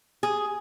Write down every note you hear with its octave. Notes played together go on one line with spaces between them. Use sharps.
G#4